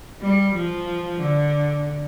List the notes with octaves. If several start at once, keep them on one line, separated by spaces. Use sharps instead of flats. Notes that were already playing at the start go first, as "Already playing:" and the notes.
G3
F3
D3